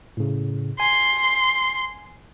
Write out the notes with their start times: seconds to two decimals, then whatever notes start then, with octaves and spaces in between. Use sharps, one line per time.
0.17 A2 C#3
0.80 G#5 C6